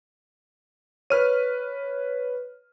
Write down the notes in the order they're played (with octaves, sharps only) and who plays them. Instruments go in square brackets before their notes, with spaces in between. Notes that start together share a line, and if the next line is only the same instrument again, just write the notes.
[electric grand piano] B4 F6 D#7 [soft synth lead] C#5